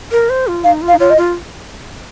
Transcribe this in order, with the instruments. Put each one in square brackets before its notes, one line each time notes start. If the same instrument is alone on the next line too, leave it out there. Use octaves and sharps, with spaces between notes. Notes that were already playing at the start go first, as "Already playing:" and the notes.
[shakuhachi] A#4
C5
F4
[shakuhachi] D#4 [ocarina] F5
[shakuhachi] F4
[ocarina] F5
[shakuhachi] D#4
[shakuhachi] F4 [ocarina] C#5
[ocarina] D#5
[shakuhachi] F4